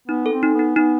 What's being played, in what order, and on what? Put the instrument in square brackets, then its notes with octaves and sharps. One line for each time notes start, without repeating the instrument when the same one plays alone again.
[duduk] B3 [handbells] D#4
[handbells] A4
[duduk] C4
[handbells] D#4
[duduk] B3 [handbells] D#4
[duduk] B3 [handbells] D#4